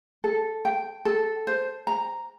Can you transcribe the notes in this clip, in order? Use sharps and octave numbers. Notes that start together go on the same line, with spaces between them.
A4
G5
A4
C5
A#5